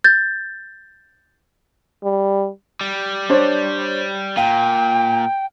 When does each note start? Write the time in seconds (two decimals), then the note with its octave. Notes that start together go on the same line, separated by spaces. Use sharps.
0.04 G6 A6
2.04 G3
2.81 G3
3.29 D4 C5 C#5
4.37 A#2 F5 G5